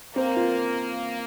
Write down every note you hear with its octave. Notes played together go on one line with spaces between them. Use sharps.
A#3 C4
F4